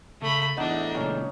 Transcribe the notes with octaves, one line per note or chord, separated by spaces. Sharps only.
C#3 A3 B5
E2 A2 D4 D#4 D5 E5 F#5
C#2 A#2 C#4 A#5